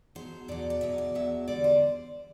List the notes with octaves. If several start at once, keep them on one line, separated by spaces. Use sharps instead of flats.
E2 B2 F#3 C5
E2 B2 F#3 D5
D5
E2 B2 F#3 E5
D5
E2 B2 F#3 E5
E2 D3 G3 D5
C5